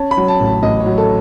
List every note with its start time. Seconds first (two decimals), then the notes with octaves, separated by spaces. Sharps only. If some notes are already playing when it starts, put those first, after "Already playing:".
Already playing: C#4 A5
0.11 B5
0.17 F#3
0.28 A5
0.40 A1
0.46 A5
0.63 A1 D#5
0.80 C#5
0.86 F#3
0.98 A4